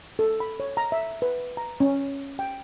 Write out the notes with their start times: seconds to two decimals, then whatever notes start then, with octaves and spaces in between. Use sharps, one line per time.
0.19 A4
0.40 B5
0.60 C#5
0.77 A#5
0.92 E5
1.22 B4
1.57 A#5
1.80 C#4
2.39 G5